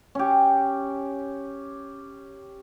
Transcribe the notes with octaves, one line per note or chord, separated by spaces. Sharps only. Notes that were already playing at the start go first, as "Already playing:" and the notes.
C#4 G4